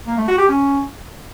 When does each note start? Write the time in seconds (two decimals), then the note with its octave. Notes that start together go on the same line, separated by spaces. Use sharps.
0.07 A#3
0.17 A3
0.27 F#4
0.38 G4
0.48 C#4